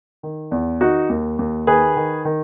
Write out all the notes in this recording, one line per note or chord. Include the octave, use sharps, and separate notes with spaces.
D#3
E2
D#3 D#4 F#4
D#2
D#2
D#3 G#4 B4
D#3
D#3